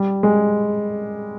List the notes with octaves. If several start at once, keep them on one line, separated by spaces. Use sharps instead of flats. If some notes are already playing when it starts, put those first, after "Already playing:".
Already playing: G3
G#3